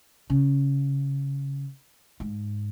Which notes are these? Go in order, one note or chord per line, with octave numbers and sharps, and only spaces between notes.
C#3
G#2